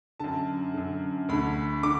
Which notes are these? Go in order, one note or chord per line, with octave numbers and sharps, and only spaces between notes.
F#2 D3 A5
F#2 D3
D2 D3 B5
D3 D6